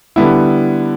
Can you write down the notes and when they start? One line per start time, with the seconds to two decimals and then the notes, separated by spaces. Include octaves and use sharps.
0.16 D3 G3 B3 E4